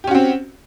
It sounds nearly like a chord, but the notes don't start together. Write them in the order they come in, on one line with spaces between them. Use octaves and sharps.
G4 C#4 F#4 C4